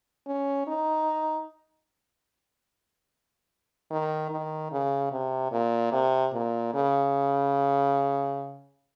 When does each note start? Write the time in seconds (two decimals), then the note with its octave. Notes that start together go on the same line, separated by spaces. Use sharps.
0.27 C#4
0.67 D#4
3.91 D#3
4.31 D#3
4.72 C#3
5.11 C3
5.52 A#2
5.92 C3
6.34 A#2
6.74 C#3